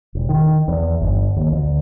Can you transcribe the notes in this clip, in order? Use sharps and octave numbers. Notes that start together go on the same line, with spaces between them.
E1
D#3
E2
G1
D#2
D2